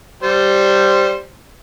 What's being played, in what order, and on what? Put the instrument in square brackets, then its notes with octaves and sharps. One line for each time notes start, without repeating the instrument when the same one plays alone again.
[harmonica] G3 C5